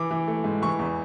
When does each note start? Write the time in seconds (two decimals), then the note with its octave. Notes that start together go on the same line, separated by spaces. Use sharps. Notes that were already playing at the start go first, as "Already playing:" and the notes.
Already playing: E3 D6
0.11 E3
0.27 A3
0.44 G#2
0.62 E3 C#6
0.79 E2